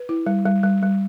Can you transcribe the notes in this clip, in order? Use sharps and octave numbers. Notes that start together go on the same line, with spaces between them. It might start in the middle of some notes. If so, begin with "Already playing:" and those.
Already playing: B4
E4
G3
G3
G3
G3